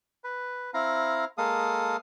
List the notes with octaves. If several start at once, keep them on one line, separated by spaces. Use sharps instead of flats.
B4
C4 E4 F5 A#5
G#3 A#3 A4 F5 D#6